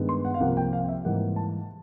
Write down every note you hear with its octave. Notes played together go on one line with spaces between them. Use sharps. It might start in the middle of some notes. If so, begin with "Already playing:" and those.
Already playing: G2 D#3 G#3 B3
C6
F#5
F5
C2 C3 F3 A#3 F#5
G5
F5
E5
G#2 E3 G3 A#3 F#5
A5